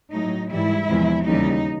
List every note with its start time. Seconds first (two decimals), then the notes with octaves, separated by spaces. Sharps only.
0.13 A2 F#3 D#4
0.51 G#2 E3 G3 E4
0.89 E2 C3 F3 G#3
1.27 D#2 C#3 E3 G3 D#4